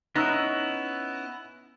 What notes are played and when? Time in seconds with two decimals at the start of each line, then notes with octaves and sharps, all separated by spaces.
0.16 B3 C#4 D#4 E4 E6 F#6 A#6